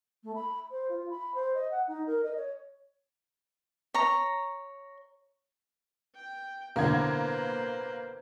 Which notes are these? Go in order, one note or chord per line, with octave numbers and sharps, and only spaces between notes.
A3
B5
C5
F4
B5
C5
D#5
F#5
D#4
A#4
D#5
C#5
C#5 A#5
G5
B1 A2 D3 A#3 B4 C5 G#6